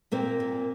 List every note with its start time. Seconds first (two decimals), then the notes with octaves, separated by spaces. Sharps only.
0.12 A#2 A#3 C4
0.40 A#2